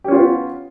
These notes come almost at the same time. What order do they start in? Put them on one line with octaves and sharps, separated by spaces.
G4 C#4 F4 B3